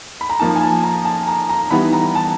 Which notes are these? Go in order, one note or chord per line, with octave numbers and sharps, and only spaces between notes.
B5
A#5
F3 A#3 D#4 A5
G#5
A5
A#5
A5
A#5
A#5
E3 G3 B3 D#4 B5
A#5
A5